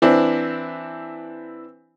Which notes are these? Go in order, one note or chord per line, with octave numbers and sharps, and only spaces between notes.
E3 C4 D4 E4